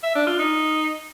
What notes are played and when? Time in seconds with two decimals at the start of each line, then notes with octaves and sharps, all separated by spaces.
0.03 E5
0.15 D4
0.27 F4
0.39 D#4